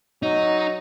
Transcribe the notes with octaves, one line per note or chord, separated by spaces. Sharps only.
F#3 D#4 D#5